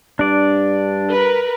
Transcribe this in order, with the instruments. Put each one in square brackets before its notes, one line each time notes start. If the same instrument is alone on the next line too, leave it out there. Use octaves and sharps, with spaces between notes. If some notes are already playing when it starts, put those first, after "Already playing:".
[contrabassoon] G2 [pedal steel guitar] D4 D5
[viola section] A#4 B4